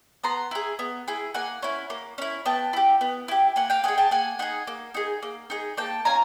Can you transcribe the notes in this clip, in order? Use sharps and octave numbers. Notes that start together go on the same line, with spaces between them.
B3 A#5 C6
E4 G#4
B3
E4 G#4
A#3 F#5 G#5
C#4 E4
A#3
C#4 E4
B3 G5 A5
E4 G4
B3
E4 G4
A#3 F#5 G#5
F5 G5
D#4 G#4 F#5 G#5
G5 A5
A#3 F#5 G#5
D#4 G#4 F#5 G#5
A#3
D#4 G#4
A#3
D#4 G#4
A#3 G5 A5
C#4 F4 G#5 A#5